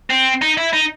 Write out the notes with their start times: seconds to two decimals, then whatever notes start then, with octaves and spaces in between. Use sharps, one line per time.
0.10 C4
0.42 D#4
0.57 E4
0.73 D#4